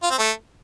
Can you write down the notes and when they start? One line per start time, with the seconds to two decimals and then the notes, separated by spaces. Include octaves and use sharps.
0.03 F4
0.11 C4
0.18 A3